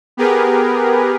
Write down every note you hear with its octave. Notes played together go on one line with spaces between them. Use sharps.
B3 G4 G#4 A#4 B4